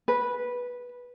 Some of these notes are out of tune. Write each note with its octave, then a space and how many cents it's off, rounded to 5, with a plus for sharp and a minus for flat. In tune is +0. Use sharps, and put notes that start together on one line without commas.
B4 -10